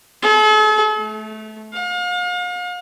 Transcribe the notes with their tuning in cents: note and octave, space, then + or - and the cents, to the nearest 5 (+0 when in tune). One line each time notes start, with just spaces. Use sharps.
A4 -45
A3 -20
F5 +40